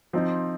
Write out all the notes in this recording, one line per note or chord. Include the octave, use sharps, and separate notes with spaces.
F3 C4 D#4